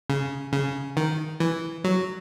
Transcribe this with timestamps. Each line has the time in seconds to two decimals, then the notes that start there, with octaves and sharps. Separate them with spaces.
0.10 C#3
0.53 C#3
0.97 D#3
1.40 E3
1.84 F#3